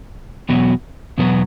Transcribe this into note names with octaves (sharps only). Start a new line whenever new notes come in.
E2 B2 F#3 B3 F#4
E2 B2 F#3 B3 F#4